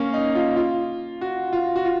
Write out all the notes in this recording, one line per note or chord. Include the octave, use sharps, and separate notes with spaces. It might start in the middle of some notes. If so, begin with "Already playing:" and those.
Already playing: A#3 C#4
D#4
F4
F4
F#4
F4
F#4
F4